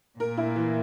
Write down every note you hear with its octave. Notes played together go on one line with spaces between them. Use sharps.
A#2 A#4
E4
E3